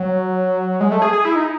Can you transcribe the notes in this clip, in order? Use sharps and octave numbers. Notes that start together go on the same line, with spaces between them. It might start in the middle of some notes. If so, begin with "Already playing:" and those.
Already playing: F#3
G#3
A3
G#4
G#4
E4
D#4